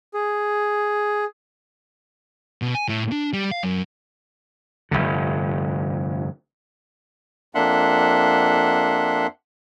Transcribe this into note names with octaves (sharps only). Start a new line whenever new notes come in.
G#4
B2
G#5
A2
D4
G3
F5
F#2
F1 B1 G2 D3
F2 A#3 D4 E5 F#5 C6